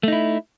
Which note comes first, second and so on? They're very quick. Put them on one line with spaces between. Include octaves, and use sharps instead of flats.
A3 D#4 E4